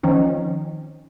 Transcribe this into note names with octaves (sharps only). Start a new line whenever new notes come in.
D#3 F3 C4 C#4 D#4